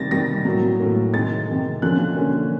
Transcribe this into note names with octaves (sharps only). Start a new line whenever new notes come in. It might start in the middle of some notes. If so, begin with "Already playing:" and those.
Already playing: C3 D#3 G3 C4 A6 A#6
C3 D#3 G3 C4 A#6
A2 F#3 A#3
A2 F#3 A#3
C3 D#3 G#3 A6
C3 D#3 G#3
D3 F3 A#3 C#4 F#6
D3 F3 A#3 C#4